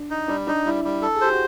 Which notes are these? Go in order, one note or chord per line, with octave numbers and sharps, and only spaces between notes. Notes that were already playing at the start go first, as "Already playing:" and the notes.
Already playing: D4
D#4
G3 D4
D4 D#4
G3 E4
G3
A4
G#4
G4 C5
F#4